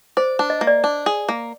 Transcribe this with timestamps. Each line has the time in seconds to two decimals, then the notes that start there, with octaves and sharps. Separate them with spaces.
0.17 C5 D5
0.39 D4
0.50 D#5
0.61 A#3
0.67 D5
0.84 D4
1.06 G#4
1.29 A#3